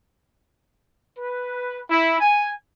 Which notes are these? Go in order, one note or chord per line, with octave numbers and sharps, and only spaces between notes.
B4
E4
G#5